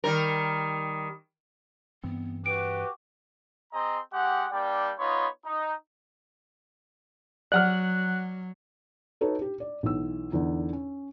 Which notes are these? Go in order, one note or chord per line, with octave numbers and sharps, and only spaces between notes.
D#3 G3 A#4
G2 E3 B3 C4
F#4 G4 B4 D7
C4 G#4 D#5 A#5 C6
G#3 G4 F#5
G3 A#3 D4 D5 G5
B3 D#4 F4 C#5 B5 C6
D#4
F#3 D5 F#5 F6 F#6
D#4 F#4 A4 B4 C#5
G4
D5
B1 E3 E6
E2 D3 D#4
C#4